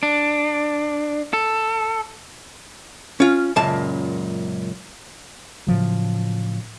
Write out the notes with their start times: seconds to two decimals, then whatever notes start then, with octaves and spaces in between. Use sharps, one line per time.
0.03 D4
1.33 A4
3.20 C#4 F4
3.56 C#2 F#2 A#2 A5
5.67 A2 C#3 F3 F#3